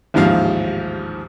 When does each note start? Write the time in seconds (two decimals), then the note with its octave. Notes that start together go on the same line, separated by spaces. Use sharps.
0.14 A1 D#2 G#2 F3 F5